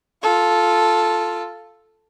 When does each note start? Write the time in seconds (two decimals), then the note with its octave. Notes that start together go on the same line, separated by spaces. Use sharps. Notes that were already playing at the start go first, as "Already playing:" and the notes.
0.22 F4 A4